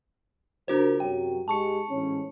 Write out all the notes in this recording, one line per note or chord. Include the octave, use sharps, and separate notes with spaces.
C#2 D4 F#4 A#4 C5
F#2 C3 F#3 G5
G#2 G#3 G4 A5 C#6 C#7
A1 G#2 C#4